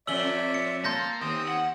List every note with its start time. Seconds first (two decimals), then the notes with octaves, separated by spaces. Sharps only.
0.07 F2 C#4 D5 E5 E6 F#7 G7
0.54 C#7
0.84 A#3 A5 C6 G6 A#6
1.21 D#2 C4 D#6
1.48 F#5